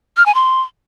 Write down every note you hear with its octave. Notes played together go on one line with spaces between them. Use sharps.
F6
G#5
C6